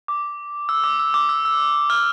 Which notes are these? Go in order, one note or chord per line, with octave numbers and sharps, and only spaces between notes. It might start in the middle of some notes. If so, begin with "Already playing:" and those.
D6
E6
D6
E6
D6
E6
E6
F6